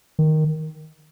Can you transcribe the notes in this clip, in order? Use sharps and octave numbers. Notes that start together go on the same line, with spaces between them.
D#3